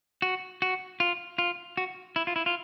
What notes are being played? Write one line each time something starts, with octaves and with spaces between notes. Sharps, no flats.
F#4
F#4
F4
F4
F#4
E4
F4
E4
F4